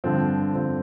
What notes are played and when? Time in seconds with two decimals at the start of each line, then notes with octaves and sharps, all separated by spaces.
0.04 G2 D3 F3 C4
0.54 G2 D3 F3 C4